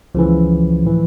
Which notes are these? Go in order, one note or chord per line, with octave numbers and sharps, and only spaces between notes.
C#2 C#3 E3 F3
A2 E3